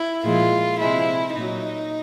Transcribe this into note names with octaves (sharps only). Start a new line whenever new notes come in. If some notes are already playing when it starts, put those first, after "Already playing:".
Already playing: E4
A#2 F3 G#3 F4
C3 F3 G#3 E4
A#2 F#3 D#4